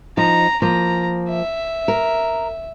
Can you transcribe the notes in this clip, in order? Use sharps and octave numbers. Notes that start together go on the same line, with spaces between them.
F3 D#4 A#5
F3 A#3 A#5
E5
A#4